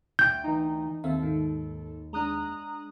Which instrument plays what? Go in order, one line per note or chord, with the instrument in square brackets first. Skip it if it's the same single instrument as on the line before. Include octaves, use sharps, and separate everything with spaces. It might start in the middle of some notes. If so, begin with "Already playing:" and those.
[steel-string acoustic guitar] D2 G5 [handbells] G6
[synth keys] E3 D#4
[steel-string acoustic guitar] D#2 [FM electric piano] C4 E5 F5 [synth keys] A4
[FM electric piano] G#2 D#3
[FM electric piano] G#3 D4 [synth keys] A#5 D#6 F#6